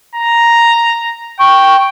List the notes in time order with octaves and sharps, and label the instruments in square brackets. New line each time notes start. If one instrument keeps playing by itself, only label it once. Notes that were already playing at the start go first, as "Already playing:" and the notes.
[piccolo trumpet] A#5
[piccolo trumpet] G5 [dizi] C#6